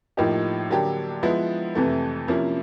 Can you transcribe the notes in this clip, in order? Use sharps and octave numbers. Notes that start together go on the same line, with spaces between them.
A2 F3 A#3 D#4 G4
D3 F#3 A#3 D4 G4
F3 G#3 B3 E4
F2 C3 E3 A3
C3 F3 A#3 C#4 E4